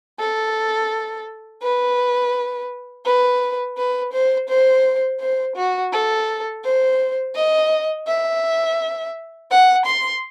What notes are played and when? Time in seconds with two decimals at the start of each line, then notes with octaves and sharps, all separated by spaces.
0.19 A4
1.62 B4
3.05 B4
3.77 B4
4.13 C5
4.49 C5
5.20 C5
5.56 F#4
5.93 A4
6.64 C5
7.35 D#5
8.07 E5
9.51 F#5
9.85 C6